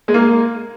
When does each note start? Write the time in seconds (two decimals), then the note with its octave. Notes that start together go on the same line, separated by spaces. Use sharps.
0.08 G#3
0.14 A#3